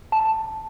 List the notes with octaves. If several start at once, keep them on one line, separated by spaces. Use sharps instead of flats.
A5